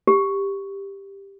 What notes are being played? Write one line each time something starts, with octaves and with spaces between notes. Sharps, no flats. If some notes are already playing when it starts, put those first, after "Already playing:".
G4